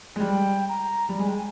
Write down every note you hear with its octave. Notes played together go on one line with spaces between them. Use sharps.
G#3
G3 G5
A#5
G3
G#3 G#5
G5
G#5